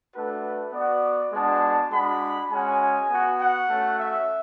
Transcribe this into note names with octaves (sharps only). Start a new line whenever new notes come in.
A3 D4 F#4 B4
B3 F#4 D5
G#3 B3 D4 F#4 A5
G#3 D4 F#4 B5
G#3 C#4 F#4 G#5
B3 F#4
F#5
A3 C#4 F#4
E5